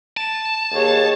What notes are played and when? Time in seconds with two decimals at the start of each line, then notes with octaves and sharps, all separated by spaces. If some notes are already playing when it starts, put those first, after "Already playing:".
0.17 A5
0.72 D#2 G#4 C#5